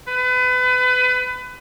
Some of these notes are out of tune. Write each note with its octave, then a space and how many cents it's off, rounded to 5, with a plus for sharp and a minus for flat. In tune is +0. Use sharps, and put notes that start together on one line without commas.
B4 +30